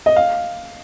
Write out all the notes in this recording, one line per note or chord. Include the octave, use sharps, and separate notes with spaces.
D#5
F5